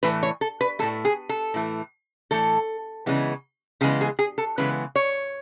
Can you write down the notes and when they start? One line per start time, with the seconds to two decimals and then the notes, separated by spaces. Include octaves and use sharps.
0.03 A2 E3 A3 B4
0.23 C#5
0.41 A4
0.61 B4
0.79 A2 E3 A3 A4
1.05 G#4
1.29 A4
1.54 A2 E3 A3
2.31 A2 E3 A3 A4
3.06 C#3 E3 G#3 B3
3.81 C#3 E3 G#3 B3 G#4
4.01 G#4
4.19 G#4
4.38 A4
4.58 C#3 E3 G#3 B3 B4
4.96 C#5